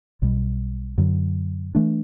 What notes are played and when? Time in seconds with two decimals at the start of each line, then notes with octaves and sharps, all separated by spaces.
0.22 B1 B2 G3
0.98 F#2 D3 F#3
1.75 E3 A3 D4